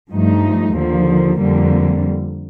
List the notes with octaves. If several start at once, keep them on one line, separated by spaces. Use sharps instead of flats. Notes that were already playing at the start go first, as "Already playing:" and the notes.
G2 F3 A3 D#4
D#2 D3 F3 A#3
F2 D3 G3 A#3